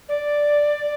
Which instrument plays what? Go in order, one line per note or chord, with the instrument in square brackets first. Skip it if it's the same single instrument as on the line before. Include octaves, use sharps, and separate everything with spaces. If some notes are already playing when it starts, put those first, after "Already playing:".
[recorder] D5